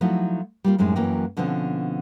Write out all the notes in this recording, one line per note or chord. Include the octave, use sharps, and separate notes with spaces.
F3 F#3 A3 D#4 E4 F#4
G3 A#3 F4
F#2 A2 G#3 C4 D#4
F#2 E3 F#3 A#3 G5
B2 D3 F3 C4 C#4